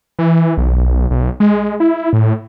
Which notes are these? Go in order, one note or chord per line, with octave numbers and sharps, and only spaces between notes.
E3
B1
B1
G#3
E4
A2